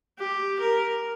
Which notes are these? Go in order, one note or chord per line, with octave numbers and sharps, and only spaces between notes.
G4
A#4